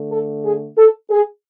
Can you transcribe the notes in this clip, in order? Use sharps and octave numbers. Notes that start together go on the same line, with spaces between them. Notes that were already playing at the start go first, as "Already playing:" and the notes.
Already playing: D3 A3
A4
G#4
A4
G#4